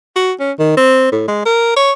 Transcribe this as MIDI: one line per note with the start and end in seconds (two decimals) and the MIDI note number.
0.16 0.33 66
0.40 0.52 61
0.59 0.76 51
0.77 1.10 60
1.12 1.23 45
1.28 1.41 56
1.45 1.76 70
1.76 1.92 73